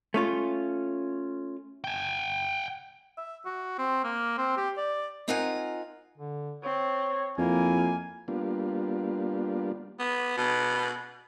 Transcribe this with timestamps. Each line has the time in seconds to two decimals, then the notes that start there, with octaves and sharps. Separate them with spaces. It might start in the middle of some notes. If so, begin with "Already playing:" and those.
0.14 A3 C#4 F4
1.84 G5 G#5
3.18 E5
3.45 F#4
3.79 C4
4.04 A#3
4.38 C4
4.57 G4
4.77 D5
5.28 C4 D#4 F4 A#4 F#5 G#5
6.18 D3
6.64 C4 C#5
7.38 F2 A#3 E4 G#5
8.28 G3 A#3 B3 D4 F4
9.99 B3
10.37 B2